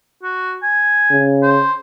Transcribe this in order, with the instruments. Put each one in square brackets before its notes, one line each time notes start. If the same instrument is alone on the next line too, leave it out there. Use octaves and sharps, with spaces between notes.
[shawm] F#4
G#5
[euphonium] C#3
[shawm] C5